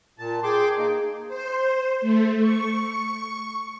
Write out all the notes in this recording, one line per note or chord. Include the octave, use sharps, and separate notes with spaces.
A#2 A5
G#4 G5 C6 D6
A#3 D#4
C5
A3
C#6